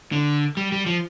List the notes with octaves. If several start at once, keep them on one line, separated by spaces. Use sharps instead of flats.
D3
G3
G3
F3